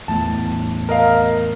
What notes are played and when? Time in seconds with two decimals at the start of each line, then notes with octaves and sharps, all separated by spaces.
0.08 E2 A2 A5
0.89 A#4 D#5 F5